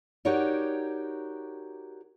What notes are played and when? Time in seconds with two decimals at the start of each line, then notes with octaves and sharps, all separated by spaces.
0.25 D#4 F#4 G4 A#4 C#5 D5